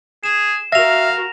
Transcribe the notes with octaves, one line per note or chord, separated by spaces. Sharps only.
G#4 E7
F#4 A#4 E5 F5 A#6 F7